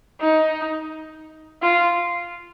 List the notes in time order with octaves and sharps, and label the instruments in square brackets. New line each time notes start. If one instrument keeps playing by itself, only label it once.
[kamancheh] D#4
F4